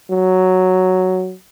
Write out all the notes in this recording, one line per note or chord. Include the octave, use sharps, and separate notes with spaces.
F#3